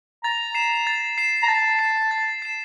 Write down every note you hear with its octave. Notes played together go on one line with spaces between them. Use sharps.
A#5 A6
C7 E7
A6
C7 E7
A#5
A5 A6
C7 E7
A6
C7 E7